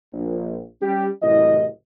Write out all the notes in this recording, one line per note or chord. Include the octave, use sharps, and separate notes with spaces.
A#1
G3 C#4 G4
F#1 C2 A2 E3 D#5